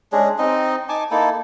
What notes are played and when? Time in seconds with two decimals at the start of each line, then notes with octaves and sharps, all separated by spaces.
0.12 G#3 C#4 D4 G#4
0.38 C4 D#4 D#5
0.89 D#4 G#5 A5 D6
1.11 A#3 D#4 E4 A4